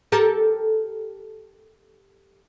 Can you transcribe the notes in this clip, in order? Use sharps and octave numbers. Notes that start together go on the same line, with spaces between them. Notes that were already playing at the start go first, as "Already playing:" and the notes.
G4 A4 A#4